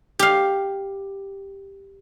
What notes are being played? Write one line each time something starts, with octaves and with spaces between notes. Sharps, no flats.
G4 F5